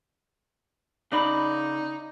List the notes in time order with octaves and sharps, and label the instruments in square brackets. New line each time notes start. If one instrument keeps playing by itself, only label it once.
[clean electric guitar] C#3 D5 B5 [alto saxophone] D#4